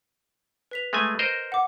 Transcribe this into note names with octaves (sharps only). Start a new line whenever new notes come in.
B4 B6 F7
G#3 A3 G#5
A#4 C5 D#5
F#5 D6